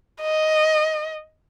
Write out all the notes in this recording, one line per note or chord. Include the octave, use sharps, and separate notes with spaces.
D#5